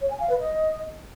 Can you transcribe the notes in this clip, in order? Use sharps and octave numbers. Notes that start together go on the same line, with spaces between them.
C#5
G#5
F5
B4
D#5